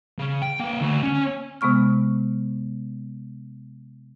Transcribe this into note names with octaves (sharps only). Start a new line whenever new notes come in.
C#3
G5
A#3 B4
D2
C#4
C3 G#3 B3 C#6 F6